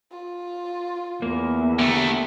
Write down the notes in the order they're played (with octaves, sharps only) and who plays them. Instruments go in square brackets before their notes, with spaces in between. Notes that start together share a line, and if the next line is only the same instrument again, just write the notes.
[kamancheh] F4
[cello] E2 [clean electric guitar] A#3
[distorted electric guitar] D3 A3 [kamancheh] G4 A#5